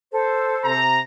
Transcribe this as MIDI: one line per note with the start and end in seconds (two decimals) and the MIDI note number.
0.13 0.80 69
0.13 0.80 72
0.64 1.00 48
0.64 1.00 82